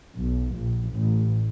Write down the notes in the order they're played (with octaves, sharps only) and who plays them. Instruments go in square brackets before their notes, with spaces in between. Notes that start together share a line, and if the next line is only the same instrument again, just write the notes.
[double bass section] B1
A#1
A1